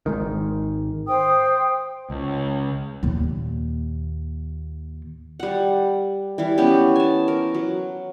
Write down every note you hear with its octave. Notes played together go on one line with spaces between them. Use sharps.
G#1 G#2 D#3
C5 G5 D#6
C#2
D#2 A#2
G3 F#5
E3 G3
B3 C#4 G4
G#5 A5
A#4
F#3